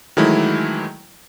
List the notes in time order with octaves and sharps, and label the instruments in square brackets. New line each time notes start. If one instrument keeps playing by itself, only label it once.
[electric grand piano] D#3 E3 F#3 G#3 A3 E4